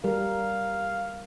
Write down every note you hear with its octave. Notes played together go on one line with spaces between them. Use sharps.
G3 A#4 F5